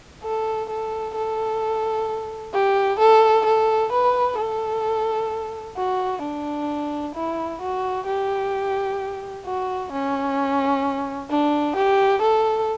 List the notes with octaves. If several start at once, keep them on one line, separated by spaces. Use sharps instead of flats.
A4
A4
A4
G4
A4
A4
B4
A4
F#4
D4
E4
F#4
G4
F#4
C#4
D4
G4
A4